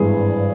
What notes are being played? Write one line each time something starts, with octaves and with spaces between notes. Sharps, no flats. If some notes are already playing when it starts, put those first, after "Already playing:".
Already playing: G#1 G2 E3 G#4